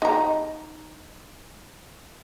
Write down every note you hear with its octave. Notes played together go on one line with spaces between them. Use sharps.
D#4 A#5